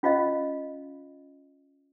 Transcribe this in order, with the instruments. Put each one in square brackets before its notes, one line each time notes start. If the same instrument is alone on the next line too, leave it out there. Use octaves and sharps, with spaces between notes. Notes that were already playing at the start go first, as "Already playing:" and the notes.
[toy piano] C#4 F4 C5 D#5 F5